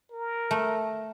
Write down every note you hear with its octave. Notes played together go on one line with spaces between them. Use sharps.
A#4
A3